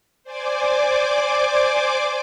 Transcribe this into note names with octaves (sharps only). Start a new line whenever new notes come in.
C5 D5 G#5 D6